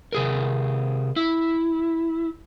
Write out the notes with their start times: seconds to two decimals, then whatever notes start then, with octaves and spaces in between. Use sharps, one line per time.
0.12 C3 G#4 A#4
1.16 E4